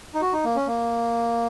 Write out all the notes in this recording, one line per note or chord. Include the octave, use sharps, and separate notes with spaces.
D#4
F#4
D#4
A#3
C#4
A#3